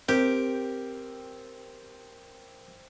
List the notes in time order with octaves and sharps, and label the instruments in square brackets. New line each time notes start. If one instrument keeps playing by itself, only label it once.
[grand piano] C4 [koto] G4 [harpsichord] A#4